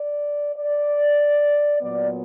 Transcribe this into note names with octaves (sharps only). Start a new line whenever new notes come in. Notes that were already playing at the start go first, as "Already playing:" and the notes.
Already playing: D5
D5
A#2 F#3 B3 D5